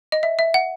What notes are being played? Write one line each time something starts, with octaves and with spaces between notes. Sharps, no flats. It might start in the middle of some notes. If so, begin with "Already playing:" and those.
D#5
E5
E5
F#5